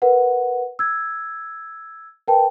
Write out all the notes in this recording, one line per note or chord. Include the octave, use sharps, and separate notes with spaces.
A#4 B4 F#5
E6 G#6
A#4 B4 G5 A5